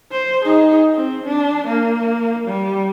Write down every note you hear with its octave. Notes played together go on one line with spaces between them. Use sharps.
C5
D#4 G#4
C4
D4
A#3
G3